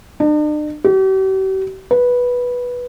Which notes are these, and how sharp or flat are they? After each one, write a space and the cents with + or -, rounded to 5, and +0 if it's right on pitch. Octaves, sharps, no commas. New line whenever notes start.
D4 +45
G4 -45
B4 -10